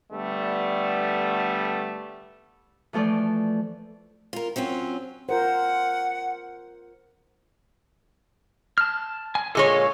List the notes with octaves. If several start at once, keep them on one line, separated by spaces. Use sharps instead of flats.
D3 G3 A3 B3
E3 F3 A3 F4 D5
F4 A#4
F#3 C4 C#4 F4
F4 A#4 C5 F#5
A5 F6
G#5
A#2 G#3 A4 C#5 F5